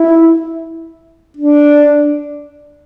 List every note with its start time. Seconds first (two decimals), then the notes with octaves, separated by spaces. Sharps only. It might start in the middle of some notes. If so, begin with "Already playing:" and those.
Already playing: E4
1.37 D4